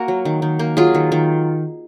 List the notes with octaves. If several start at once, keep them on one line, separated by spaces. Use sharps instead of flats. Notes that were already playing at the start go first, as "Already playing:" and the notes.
Already playing: A#3 F#4 A#4
F#3
D#3
D#3
A#3
F#3 F4 G#4
D#3
D#3